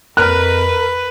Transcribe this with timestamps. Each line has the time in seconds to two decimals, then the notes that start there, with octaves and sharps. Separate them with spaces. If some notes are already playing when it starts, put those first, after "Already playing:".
0.17 F2 A#4 B4 F#6